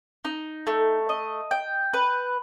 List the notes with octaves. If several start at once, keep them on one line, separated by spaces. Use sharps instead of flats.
D#4
A3
D#5
G5
B4